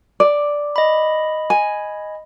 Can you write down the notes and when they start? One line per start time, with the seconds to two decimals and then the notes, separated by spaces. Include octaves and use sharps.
0.20 D5
0.76 D#5 B5
1.50 G#5